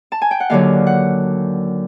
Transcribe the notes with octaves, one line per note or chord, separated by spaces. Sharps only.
A5
G#5
G5
F#5
D#2 D3 F#3 F5
F#5